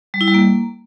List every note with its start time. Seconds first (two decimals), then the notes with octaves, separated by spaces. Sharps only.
0.14 G3
0.21 E4
0.27 G3
0.34 A#3